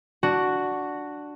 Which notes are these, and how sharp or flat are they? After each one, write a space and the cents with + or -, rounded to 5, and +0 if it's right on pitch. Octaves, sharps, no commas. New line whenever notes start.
D4 +0 F#4 +0